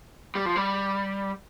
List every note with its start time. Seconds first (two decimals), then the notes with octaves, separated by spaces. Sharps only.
0.35 G3
0.45 F3
0.56 G3